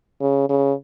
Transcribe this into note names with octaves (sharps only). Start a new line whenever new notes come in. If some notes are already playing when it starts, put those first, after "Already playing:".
C#3
C#3